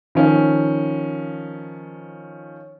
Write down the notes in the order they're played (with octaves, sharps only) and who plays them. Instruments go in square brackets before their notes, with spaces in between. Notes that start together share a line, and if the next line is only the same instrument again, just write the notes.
[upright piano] D#3 F3 C#4